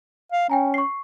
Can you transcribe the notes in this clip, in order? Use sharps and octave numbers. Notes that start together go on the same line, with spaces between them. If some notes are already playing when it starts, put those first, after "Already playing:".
F5
C#4 G5 G#5 A#5
C#6 C7